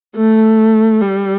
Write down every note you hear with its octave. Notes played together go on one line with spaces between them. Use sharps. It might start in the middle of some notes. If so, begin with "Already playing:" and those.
A3
G3